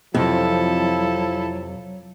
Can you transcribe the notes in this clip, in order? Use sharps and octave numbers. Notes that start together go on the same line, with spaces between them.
F2 C3 F3 F#3 E4 A4